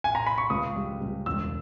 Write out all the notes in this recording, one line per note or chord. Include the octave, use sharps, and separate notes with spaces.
G#5
A#5
B5
C#6
C#2 D#6
G3
C#2
E1 E6